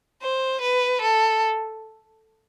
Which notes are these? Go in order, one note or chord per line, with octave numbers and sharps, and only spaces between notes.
C5
B4
A4